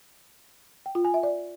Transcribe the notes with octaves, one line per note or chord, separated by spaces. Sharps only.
G5
F4
G#5
E5
D5